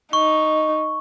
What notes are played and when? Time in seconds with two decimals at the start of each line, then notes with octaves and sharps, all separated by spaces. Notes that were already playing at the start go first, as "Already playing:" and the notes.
0.13 D#4 C#6